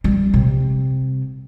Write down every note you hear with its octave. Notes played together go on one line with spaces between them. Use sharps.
G3
C3